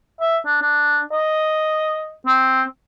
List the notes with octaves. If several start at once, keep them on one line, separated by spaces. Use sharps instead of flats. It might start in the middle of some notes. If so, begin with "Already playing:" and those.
E5
D4
D4
D#5
C4